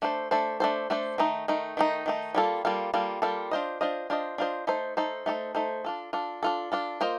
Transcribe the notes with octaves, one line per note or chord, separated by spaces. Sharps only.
A3 D4 A4 C5
A3 D4 A4 C5
A3 D4 A4 C5
A3 D4 A4 C5
D#3 A3 D#4
D#3 A3 D#4
D#3 A3 D#4
D#3 A3 D#4
G3 A#3 F4 A4
G3 A#3 F4 A4
G3 A#3 F4 A4
G3 A#3 F4 A4
D4 F4 C5 D#5
D4 F4 C5 D#5
D4 F4 C5 D#5
D4 F4 C5 D#5
A3 D#4 A4 C5
A3 D#4 A4 C5
A3 D#4 A4 C5
A3 D#4 A4 C5
D4 F4 A4
D4 F4 A4
D4 F4 A4
D4 F4 A4
A#3 F4 C5 D#5